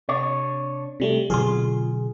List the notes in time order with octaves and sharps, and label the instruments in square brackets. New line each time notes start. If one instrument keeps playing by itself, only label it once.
[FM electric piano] C3 [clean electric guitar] D4 C#5
[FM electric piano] C3 G3 A3
[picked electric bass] B2 D3 F#3 [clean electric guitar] F4 C6 [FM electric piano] G#4